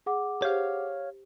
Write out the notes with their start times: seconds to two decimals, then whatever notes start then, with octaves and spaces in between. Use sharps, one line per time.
0.06 G#4 F#5 D6
0.42 G4 C5 C#5 F5